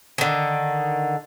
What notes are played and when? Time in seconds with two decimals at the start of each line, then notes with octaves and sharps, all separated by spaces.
0.18 D3 D#3